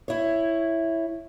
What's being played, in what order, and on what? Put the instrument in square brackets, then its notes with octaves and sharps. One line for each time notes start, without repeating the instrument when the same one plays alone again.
[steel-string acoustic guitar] E4 C#5